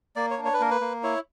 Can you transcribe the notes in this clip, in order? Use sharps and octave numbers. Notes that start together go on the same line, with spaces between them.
A#3 D5
C#5
D4
C#5
B4
A#3 A#4
B4
A#3
E4 C#5